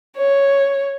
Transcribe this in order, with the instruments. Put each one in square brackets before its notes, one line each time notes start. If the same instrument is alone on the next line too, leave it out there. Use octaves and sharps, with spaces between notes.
[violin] C#5